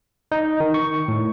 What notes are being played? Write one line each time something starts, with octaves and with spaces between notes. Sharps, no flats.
D#4
D#3
C#6
A2